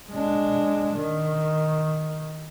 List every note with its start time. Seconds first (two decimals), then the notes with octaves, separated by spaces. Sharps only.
0.11 G#3 D4
0.96 D#3